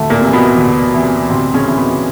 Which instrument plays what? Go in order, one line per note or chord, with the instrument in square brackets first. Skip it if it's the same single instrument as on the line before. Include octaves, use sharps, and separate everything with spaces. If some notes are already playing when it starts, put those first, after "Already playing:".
Already playing: [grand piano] D2 C3 E3 A3
A#2 A#3
C3
E3
B2 B3
D2
C3 E3
D2 C3 C4
C#3 C#4
C3 E3
B2 B3